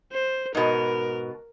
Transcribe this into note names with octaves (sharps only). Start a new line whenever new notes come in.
C5
G#2 B2 A#4